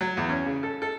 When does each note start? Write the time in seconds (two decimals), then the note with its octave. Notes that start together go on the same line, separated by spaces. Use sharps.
0.01 F#3
0.17 E2
0.29 C#4
0.46 C#3
0.63 A4
0.82 A4